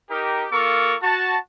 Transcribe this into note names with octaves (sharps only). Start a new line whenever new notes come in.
D#4 G4 A#4
A#3 F4 A4 A#4 C#6 D6
F#4 A5